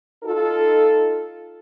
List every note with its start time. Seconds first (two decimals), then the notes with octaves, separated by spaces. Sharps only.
0.24 D#4 F4 A4